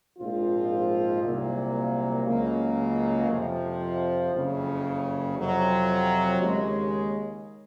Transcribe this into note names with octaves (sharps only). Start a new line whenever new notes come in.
A#1 G#2 F3 C4 F4
C2 A#2 F#3 A#3
C#2 C#3 F#3 A#3
F2 C3 F3
F#1 F2 C#3
F2 C3 F#3 C4 F4
D#2 C#3 G#3